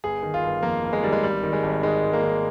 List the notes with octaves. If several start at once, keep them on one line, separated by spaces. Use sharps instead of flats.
G1 G#4
D#3
F4
G1
F2 A#3
G1
G#3
D#3 G3
G#3
G#1 G3
D#3
G#3
G#1
G#2 G#3
G#1
A#3
D#3